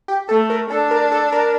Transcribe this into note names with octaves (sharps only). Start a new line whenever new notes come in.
G4
A3 A4
A#4
D4 A4
A#4
A4
A#4